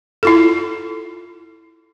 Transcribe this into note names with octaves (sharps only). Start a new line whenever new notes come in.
E4 F4 A4